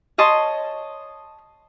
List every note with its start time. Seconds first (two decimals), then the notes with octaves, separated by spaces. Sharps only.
0.18 C#5 D#5 A5 C6